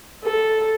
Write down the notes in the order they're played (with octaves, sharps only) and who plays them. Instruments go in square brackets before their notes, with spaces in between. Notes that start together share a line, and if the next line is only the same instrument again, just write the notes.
[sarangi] A4